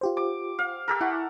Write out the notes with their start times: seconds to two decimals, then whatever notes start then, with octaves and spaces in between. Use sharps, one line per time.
0.01 F4 G4 C5
0.17 D6
0.59 F5
0.88 G4 A4 A#4
1.01 E4 F#5 G#5 C#6